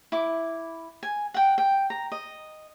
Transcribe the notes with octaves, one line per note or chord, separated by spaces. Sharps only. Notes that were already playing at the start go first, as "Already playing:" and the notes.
E4 D6
G#5
F#5 G5
G5
A#5
D#5